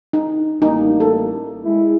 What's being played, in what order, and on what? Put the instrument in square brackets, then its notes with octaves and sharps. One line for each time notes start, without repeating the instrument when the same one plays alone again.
[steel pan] D#4
[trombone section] A1 G3 A#3 [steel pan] D#4
[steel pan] A4
[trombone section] G#3 E4